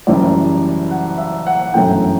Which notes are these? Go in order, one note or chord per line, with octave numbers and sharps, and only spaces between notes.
F#1 F#2 E3 G3 D5
F#5
E5
F#5
G1 F#2 E3 A3 G5